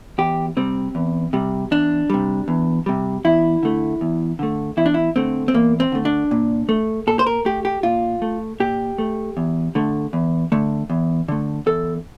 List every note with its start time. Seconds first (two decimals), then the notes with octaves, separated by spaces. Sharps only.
0.18 E2 G4
0.57 C3 G3 C4
0.95 E2
1.33 C3 G3
1.71 E2 D4
2.10 C3 G3
2.48 E2
2.86 C3 G3
3.24 E2 E4
3.63 D3 A3
4.01 E2
4.39 D3 A3
4.77 E2 E4
4.86 D4
4.94 E4
5.16 D3 A3 C4
5.48 C4
5.54 E2 A#3
5.80 C4
5.92 D3 A3
6.05 D4
6.31 A#2
6.69 A3
7.07 A#2 A4
7.19 C5
7.27 A#4
7.45 A3 G4
7.65 G4
7.83 A#2 F4
8.22 A3
8.60 A#2 G4
8.98 A3
9.37 E2
9.75 D3 A3
10.13 E2
10.52 D3 A3
10.90 E2
11.28 D3 A3
11.66 E2 A4